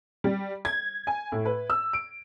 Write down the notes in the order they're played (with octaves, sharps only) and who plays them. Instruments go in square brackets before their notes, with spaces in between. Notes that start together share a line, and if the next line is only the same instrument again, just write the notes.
[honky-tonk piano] G3
G#6
G#5
A2
B4
E6
D7